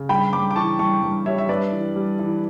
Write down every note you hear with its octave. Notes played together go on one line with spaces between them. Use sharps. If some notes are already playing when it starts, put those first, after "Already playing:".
Already playing: C#3
G2 G5 B5
G2 B5 D6
D6
E3 A5 C#6
G2 A5 C#6
G2
G3 C#5 E5
E5
G2 B4 D5
E3
G3
E3